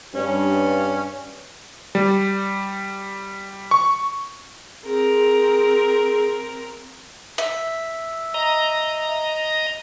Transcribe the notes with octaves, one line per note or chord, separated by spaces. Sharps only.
G2 C#4
G3
C#6
C4 G#4 A#4
E5
D#5 A#5